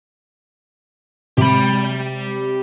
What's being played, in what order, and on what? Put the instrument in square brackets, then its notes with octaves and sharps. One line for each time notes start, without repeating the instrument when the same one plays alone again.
[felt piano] C3 [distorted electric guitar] G4 B5